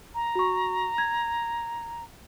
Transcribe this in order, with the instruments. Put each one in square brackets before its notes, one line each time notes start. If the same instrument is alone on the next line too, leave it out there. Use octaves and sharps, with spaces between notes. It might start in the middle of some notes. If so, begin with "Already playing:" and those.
[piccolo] A#5
[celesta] F#4 C#6
G#6